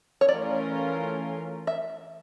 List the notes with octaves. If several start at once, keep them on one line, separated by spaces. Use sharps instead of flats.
C#5
E3 A3 C#4 F4 A#4 D5
E5